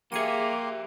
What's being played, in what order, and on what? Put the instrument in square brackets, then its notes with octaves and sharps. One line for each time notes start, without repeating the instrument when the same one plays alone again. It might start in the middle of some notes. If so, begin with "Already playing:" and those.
[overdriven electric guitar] F3 E5 [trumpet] A#3 [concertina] G4 C6 [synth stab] G#4 C#7 D#7